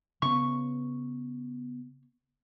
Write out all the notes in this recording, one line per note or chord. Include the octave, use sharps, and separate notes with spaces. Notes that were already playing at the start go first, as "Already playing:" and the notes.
C#3 B3 C#6